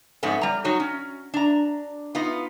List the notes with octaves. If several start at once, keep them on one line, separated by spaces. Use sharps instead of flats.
F2 G#2 A3 B3 C#4
G3 A#5
F#3 D#4 F#4 C#5
C#4
D4 A#5
B3 D#4 F4